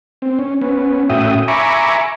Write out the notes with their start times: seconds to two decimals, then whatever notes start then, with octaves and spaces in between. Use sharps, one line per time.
0.22 C4
0.39 C#4
0.61 B3 C#4
1.09 A2 C#4 F#4 E5 G5 D#6
1.48 E5 G#5 A#5 B5 C#6 D6